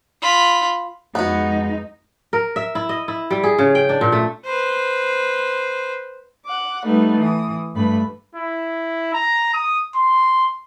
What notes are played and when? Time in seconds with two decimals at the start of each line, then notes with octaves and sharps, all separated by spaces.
0.21 F4 B5
1.15 F2 G#3 B3 D#4 F#4
2.33 A#4
2.56 E5
2.75 E4
2.89 D#5
3.08 E4
3.31 G3
3.43 G#4
3.58 C#3
3.75 G5
3.89 D4
4.01 A#2
4.12 A3
4.45 B4 C5
6.46 F#5 D6
6.84 G3 A3 B3 D#4
7.17 E3 D#6
7.74 G2 G3 A3 B4 B5
8.35 E4
9.13 A#5
9.53 D#6
9.95 C6